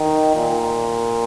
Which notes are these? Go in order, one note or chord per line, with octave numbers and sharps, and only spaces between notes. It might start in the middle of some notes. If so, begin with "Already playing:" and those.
Already playing: D#3
A#2